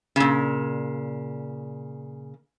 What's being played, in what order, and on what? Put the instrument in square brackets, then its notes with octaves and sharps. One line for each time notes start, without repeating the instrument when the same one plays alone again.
[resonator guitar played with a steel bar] A#2 C#3